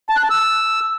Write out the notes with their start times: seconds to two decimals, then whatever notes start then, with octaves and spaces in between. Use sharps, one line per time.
0.09 A5
0.17 F#6
0.24 A5
0.31 E6